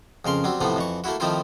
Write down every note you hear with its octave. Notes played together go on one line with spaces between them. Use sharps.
F2 C#3 A#4 C6
F#3 G3 C4
A2 C3 E3 F3 A3 B3
F2 E3 C#6
A3 A#3 E4 F#4
D#3 F3 A3 C4 E4 F4